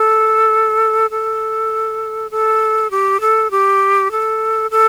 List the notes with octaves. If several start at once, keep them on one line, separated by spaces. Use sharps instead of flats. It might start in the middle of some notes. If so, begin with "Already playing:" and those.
Already playing: A4
A4
A4
G4
A4
G4
A4
A4